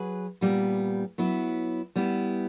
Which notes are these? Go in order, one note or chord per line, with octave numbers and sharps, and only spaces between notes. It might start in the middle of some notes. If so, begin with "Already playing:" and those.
Already playing: F#3 G#4 B4
A#2 G3 B3
F#3 B3 E4
G3 B3 E4